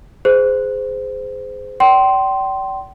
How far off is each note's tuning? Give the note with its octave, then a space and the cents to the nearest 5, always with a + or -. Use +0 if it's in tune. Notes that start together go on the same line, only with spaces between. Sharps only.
G#4 +0 C5 -25
D5 -25 G5 -35 C6 +0